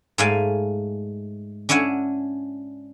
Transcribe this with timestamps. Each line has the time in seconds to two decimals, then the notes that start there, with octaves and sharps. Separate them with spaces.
0.18 G#2 G#3 A3 D5 F5 G#5
1.69 C#4 D4 E4 C#5 F#5 G#5